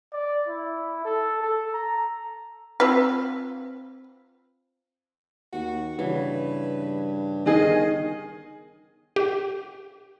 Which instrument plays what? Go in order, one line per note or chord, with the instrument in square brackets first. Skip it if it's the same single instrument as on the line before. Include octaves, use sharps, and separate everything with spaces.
[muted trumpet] D5
E4
A4
A4
A#5
[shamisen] C4 F4 B4
[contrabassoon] D#2 [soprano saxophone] F#4
[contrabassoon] G2 [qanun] C#3 E3 [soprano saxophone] B4
[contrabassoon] G1 [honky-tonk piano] D#3 G#4 [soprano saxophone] D#5
[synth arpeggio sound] G4